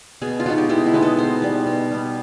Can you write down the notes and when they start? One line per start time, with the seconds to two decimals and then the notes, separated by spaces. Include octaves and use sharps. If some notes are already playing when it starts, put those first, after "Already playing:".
0.22 B2 G#4
0.40 F4
0.46 G#3 B3 D#4 F#4
0.58 G4
0.69 B2 E4
0.86 E4
0.94 G#3 B3 D#4
1.02 A4
1.18 B2 C5
1.42 G3 B3
1.66 B2
1.91 G3 B3